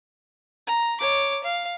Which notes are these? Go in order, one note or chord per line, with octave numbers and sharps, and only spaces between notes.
A#5
C#5 D6
F5